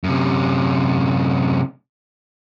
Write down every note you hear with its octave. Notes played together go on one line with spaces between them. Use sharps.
F#2 C3